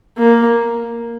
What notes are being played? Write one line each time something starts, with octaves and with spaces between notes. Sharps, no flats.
A#3